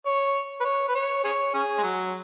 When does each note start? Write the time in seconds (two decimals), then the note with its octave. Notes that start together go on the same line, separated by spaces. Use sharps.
0.06 C#5
0.60 B4
0.65 C#5
0.88 B4
0.95 C#5
1.24 G#4 C#5
1.54 C#4 G#4
1.78 G#3
1.83 F#3